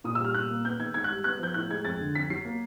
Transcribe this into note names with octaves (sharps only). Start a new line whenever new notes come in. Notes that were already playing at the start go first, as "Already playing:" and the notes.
A#2 D#6
E6
G3 F6
A#2 F#6
A#3
B3 G6
D#3 G#6
G#2 G#6
F#6
G3
B3 F#6
F3 G6
A2 F#6
G#3 G#6
F2 A6
D3
F2 B6
F#3 C7
A#3